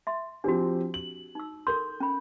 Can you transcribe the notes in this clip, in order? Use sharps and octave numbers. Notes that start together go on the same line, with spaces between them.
E5 C6
F3 C4 D4 F#4 G4
F#7
D#4 E6
A4 A#4 C6 G6
C#4 B5